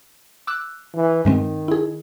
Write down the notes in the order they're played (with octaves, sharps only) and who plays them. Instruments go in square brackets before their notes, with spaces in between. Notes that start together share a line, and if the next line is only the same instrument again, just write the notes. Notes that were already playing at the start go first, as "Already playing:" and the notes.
[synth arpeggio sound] D6 E6 F#6
[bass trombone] E3
[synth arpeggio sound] G2 G#3 C4 [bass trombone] D#3
[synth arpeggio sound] E4 G#4